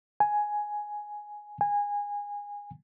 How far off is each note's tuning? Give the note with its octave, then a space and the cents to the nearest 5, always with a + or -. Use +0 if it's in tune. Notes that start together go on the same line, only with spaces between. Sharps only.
G#5 +5
G#5 -20